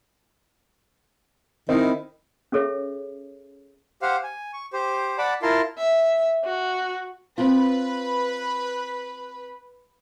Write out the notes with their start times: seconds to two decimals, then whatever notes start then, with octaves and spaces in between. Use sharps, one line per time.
1.69 D#3 C4 E4 D#5
2.52 C#4 G#4 A4 C#5 E5
4.02 G4 C5 F5 F#5
4.24 G#5
4.53 C#6
4.73 G4 C5
5.18 D5 F#5 A5 B5 D6
5.42 E4 F4 A#4 A5 C6
5.78 E5
6.44 F#4
7.38 C4 F4 B4